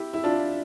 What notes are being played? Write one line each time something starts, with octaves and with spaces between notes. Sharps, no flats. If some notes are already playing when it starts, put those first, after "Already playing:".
Already playing: E4 G4
E4
D4 F4